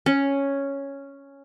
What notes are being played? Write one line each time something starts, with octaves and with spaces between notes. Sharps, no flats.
C#4